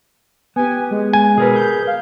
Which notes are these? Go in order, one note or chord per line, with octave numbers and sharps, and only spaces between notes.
B3 G4 G#5
G#3
G#5
B2 G#4 A#4 B4
G6
F5